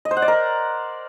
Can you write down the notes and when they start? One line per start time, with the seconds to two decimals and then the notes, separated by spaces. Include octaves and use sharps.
0.05 D#5
0.11 C5
0.17 F#5
0.22 D5
0.28 A#4